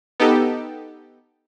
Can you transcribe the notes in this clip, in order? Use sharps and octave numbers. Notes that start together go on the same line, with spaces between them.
B3 D#4 G4 A4